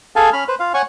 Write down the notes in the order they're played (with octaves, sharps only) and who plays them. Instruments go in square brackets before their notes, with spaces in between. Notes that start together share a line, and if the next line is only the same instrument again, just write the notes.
[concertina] G#4 A4 F5 G#5 A5
C#4 B5 F6
B4 C5
F4 F5
C#5 F#5 G#5 C#6